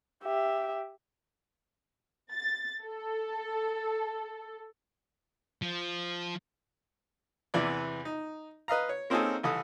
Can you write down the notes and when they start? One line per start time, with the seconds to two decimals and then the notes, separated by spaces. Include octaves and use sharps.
0.24 G4 E5
2.32 A6
2.83 A4
5.62 F3
7.54 E2 C3 E3 B3 D5
8.05 D#4
8.68 B4 D#5 F5 A#5
8.89 C#5
9.10 A#3 C4 C#4 D#4 G#4 A4
9.43 C2 E3 A4 D#6